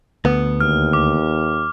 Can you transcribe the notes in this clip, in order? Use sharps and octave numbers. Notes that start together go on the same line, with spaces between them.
D2 B3
D#2 F6
D6